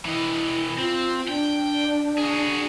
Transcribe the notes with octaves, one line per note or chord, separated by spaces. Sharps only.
E3 E4 D#5
C4 F4
D4 G5
F#4 G#4